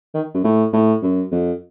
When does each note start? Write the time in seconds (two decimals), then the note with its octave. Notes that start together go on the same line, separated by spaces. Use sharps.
0.14 D#3
0.34 F#2
0.44 A2
0.73 A2
1.02 F#2
1.32 F2